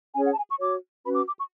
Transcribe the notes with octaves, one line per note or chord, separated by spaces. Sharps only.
C#4 G#4 C#5 G#5
F#5
A5
G#5
C#6
F#4 C#5 D6
C#4 F#4 B4 B5
D6
D6
C#6